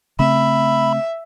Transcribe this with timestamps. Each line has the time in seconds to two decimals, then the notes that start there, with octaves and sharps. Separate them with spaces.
0.19 C#3 A3 C4 E5 B5